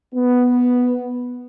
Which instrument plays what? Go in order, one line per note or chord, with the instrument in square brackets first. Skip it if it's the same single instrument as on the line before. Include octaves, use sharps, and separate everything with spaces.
[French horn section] B3